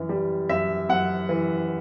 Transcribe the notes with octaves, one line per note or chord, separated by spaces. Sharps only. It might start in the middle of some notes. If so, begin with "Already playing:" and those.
Already playing: F#2 E3
G3
F#2 E5
F#2 F#5
E3